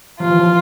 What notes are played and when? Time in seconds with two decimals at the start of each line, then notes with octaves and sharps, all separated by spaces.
0.20 F3 F4
0.30 E3
0.39 F3